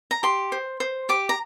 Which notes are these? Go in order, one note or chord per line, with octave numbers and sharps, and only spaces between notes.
A#5
G4 C6
C5
C5
G4 D6
A#5